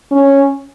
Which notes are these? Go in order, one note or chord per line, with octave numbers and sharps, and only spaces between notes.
C#4